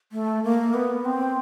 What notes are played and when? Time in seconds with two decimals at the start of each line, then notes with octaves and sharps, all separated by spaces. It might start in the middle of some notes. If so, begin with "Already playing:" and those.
0.12 A3
0.44 A#3
0.74 B3
1.05 C4